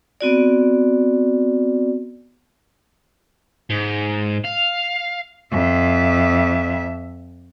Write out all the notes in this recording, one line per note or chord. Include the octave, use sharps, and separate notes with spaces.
B3 C4 F#4 D5
G#2
F5
F2 E5